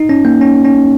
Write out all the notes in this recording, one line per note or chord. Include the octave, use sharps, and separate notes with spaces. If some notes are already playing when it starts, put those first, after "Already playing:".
Already playing: D#4
C#4
A#3
C#4
C#4